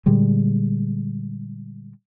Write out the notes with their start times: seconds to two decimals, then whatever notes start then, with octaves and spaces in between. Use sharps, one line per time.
0.06 A#2 D3 G3 G#3